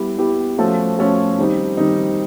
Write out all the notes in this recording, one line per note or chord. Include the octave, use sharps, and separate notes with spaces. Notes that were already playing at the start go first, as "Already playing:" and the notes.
Already playing: G3 B3 E4 G4
G3 B3 E4 G4
F3 A3 C#4 F#4 A4
F3 A3 C#4 F#4 A4
D#3 G3 C4 D#4
D#3 G3 C4 D#4